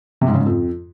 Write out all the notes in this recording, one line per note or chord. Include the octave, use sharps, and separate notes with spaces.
C3
G#2
C#3
G#2
F2